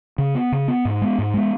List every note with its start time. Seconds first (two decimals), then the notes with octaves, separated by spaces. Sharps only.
0.18 C#3
0.35 B3
0.52 C#3
0.68 B3
0.85 G#2
1.02 G#3 B3
1.18 G#2
1.34 G#3 B3